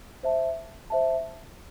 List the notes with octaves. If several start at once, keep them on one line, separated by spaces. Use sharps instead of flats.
C5 E5 A5
C5 E5 A5